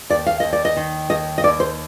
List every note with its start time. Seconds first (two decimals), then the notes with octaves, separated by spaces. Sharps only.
0.10 D#2 D5
0.26 F5
0.40 D#2 D#5
0.53 D5
0.65 D#5
0.76 D#3
1.10 D#2 D#5
1.38 D#5
1.44 D#2 D5
1.60 C5